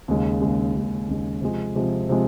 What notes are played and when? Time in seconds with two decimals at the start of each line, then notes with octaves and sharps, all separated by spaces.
0.08 D#2 C#3 G#3
0.42 D#2 C#3 G#3
0.74 D#2 C#3 G#3
1.08 D#2 C#3 G#3
1.41 C3 F3 G#3
1.75 C3 F3 G#3
2.09 C3 F3 G#3